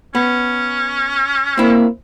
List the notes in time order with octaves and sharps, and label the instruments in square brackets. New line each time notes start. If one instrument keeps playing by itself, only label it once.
[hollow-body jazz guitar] B3 [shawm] C#4
[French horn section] A#3 [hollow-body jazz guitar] C4 E4